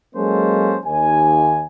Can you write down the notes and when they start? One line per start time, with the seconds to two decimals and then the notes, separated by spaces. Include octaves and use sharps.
0.15 F#3 G#3 A#3 C#4 A4 C5
0.84 D#2 G#5